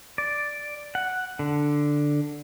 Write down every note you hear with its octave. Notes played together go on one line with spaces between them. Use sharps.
D5
F#5
D3